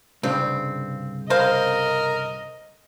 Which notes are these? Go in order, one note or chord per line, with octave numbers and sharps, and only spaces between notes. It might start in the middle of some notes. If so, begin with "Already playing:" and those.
C2 G2 C#3 C4
A#4 C5 D#5 F5